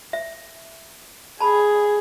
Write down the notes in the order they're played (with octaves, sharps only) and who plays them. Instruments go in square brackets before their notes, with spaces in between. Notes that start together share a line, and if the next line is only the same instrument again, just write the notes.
[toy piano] E5
[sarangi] G#4 [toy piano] A5 B5